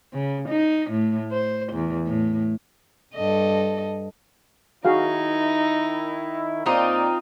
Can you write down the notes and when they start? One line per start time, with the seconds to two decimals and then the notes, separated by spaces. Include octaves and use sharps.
0.14 C#3
0.49 D#4
0.91 A2
1.32 C5
1.73 E2
2.07 A2
3.14 G2 A4 D#5
4.85 D#3 D#4 E4 F#4 G#4 F5
6.66 A#2 C4 D#4 F4 C5 D5